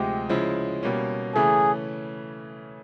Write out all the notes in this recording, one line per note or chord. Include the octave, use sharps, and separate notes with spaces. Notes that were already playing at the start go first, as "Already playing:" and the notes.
Already playing: D2 C3 F3 G#3 G4
C#3 F3 G#3 C#4 E4
B2 G3 A#3 C#4
C#3 E3 A3 C#4 G#4